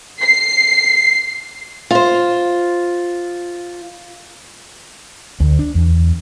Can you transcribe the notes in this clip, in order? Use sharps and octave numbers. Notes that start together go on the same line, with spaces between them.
C7
F4 C5
D2
D4
E2